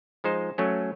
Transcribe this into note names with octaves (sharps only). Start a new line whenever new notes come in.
F3 G#3 D#4 C5
F#3 A3 C#4